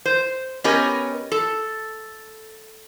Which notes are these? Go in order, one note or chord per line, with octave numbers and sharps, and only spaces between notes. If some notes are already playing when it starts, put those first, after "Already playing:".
C5
B3 C#4 G4 A#4 D#5 G#5
A4